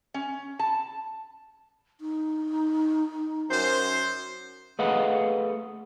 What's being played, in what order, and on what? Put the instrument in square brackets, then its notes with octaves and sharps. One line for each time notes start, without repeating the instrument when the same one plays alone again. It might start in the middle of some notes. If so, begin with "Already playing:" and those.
[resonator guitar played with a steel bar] C#4
A5
[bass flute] D#4
[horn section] F#2 C5
[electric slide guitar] A3 G#4 B4 D#5 F5 F#5